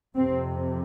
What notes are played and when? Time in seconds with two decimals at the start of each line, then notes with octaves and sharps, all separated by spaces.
0.16 F2 C3 C4